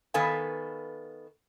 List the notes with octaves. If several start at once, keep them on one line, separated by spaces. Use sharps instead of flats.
D#3 B3 A4 B4 F5 G#5